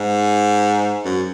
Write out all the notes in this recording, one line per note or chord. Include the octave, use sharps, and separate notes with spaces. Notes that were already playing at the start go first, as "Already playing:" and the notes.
Already playing: G#2
F#2